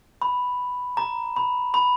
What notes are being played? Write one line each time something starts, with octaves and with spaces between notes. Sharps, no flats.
B5
A#5
B5
B5